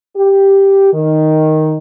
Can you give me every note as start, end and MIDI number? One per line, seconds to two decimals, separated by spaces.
0.17 0.91 67
0.94 1.77 51